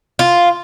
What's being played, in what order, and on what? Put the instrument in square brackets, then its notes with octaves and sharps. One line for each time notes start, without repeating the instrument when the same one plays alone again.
[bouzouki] F4